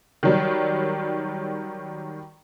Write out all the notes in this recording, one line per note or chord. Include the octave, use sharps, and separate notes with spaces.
D#3 F#3 G3